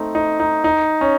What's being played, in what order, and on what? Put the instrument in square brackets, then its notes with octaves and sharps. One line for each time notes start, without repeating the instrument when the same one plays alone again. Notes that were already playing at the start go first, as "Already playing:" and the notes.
Already playing: [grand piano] A3 C4 D#4
D#4
D#4
D#4
C#4